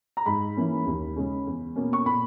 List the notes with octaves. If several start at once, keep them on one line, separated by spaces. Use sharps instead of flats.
A#5
G#2 B5
E3 A#3 C#4
D#2
C#3 G#3 C#4
E2
B2 A#3 C#4
C#6
A#2 B5